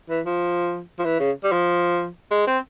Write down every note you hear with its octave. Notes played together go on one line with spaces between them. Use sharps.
E3
F3
F3
E3
C#3
G3
F3
G#3
C4